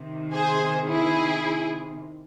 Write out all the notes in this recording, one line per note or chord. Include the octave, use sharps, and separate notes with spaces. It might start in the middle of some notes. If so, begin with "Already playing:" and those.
Already playing: C3 D#3
G#4 C5
E4 G#4